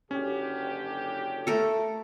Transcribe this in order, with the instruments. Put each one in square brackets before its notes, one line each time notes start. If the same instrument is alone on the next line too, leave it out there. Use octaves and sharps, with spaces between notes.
[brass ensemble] F#1 D3 G4 [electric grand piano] C#4
[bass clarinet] A3 [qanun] A4 A#4